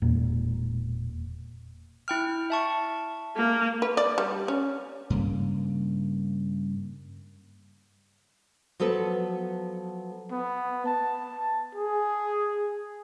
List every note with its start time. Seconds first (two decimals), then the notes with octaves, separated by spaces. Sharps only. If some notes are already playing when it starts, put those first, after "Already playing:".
0.02 E1 A#2
2.08 E4 G5 F6
2.50 E5 A5 C#6
3.36 A#3
3.82 B4
3.97 D5
4.18 G3
4.48 C#4
5.10 G2 C#3 A#3
8.80 F3 F#3 B3 A4 B4
10.31 B3
10.86 A5
11.75 G#4